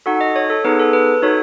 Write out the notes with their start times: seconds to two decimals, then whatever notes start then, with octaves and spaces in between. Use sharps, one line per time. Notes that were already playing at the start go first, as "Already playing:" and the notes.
0.06 D#4 F#4 A4 F#5
0.21 D#5
0.36 C#5
0.50 A4
0.64 B3 D#4 G#4 B4
0.79 A4
0.93 B4
1.22 D#4 F#4 A4 C#5